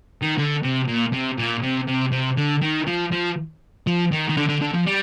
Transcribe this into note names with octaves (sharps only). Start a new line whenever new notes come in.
D#3
D3
C3
A#2
C3
A#2
C3
C3
C3
D3
D#3
F3
F3
F3
D#3
D#3
D3
D3
D3
F3
G3